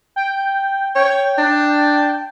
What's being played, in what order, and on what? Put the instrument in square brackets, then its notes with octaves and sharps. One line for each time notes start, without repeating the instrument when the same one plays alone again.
[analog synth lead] G5
[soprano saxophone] C#5 [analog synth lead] G5
[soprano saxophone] D4